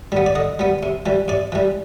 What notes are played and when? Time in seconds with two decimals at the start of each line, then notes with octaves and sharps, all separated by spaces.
0.12 G3 B3
0.26 D5
0.35 D3 D#5
0.59 G3 B3
0.83 C3
1.06 E3 G3
1.28 C3 D5
1.52 E3 G3